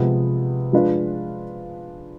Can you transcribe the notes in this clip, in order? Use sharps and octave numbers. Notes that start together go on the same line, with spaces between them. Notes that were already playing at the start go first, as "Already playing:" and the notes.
Already playing: C3 F3 G#3 B3
F3 G#3 D4 F4 B4